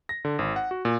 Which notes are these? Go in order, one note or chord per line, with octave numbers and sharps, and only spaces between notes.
A#6
D3
G#1
F#5
F#4
A#2